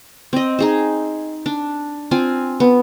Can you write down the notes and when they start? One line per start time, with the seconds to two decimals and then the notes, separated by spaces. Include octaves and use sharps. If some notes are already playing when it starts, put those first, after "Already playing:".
0.33 C4 D#5
0.59 D#4 G#4 C5
1.46 D4
2.11 C4 F4 G#5
2.60 B3